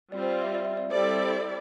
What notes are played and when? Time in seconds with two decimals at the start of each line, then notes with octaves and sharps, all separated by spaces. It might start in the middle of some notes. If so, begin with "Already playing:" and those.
0.12 G3 C4 F4 D5
0.22 C5
0.32 D5
0.42 E5
0.55 D5
0.65 E5
0.77 D5
0.90 G3 C4 E4 A4 C5 D5